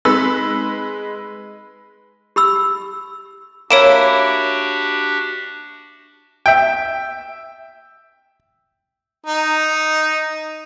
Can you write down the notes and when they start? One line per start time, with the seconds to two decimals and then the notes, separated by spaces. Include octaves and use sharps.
0.05 G#3 C4 D#4 B4 E6
2.36 G4 B5 E6
3.71 A#3 D4 E4 F#4 G4 C#5 D7 E7
6.46 E5 G5
9.26 D#4